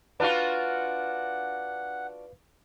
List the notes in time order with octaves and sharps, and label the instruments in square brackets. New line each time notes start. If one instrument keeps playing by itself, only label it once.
[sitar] D4 F4 F#4 [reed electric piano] B4 F5 [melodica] F#5